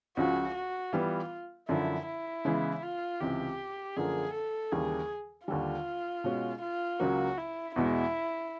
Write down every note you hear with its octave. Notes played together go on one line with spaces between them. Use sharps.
C#2 C#3 F3 F#4
F#4
E3 G3 B3 F4
F#2 D3 F3 E4
E4
C#3 E3 G#3 B3
F4
C#2 C3 E3 G4
F#2 D3 F3 A#3 G#4
A4
D#2 C#3 E3 G3 A#3 G#4
D#2 D3 G3 F4
B2 G#3 C#4 F#4
F4
C#2 C#3 F#3 A#3 F#4
E4
E2 B2 G#3 E4